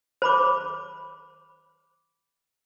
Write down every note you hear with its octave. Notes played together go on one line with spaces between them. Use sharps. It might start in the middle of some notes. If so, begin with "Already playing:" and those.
C5 B5 D6